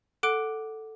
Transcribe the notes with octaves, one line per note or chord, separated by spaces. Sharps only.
A4 F#5 D6 F#6 D7